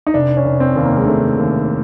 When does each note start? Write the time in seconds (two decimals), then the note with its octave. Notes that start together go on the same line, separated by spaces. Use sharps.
0.07 D#4
0.14 F1 D4
0.37 C#4
0.45 F1
0.60 C4
0.76 D#2
0.84 A#3
0.97 G#3
1.07 F1 A3
1.38 D#2